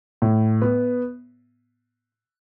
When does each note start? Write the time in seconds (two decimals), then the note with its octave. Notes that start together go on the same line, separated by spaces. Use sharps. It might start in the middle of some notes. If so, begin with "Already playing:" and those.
0.22 A2
0.62 B3